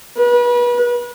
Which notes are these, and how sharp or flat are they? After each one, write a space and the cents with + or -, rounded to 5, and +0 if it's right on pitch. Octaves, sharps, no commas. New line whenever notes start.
B4 -30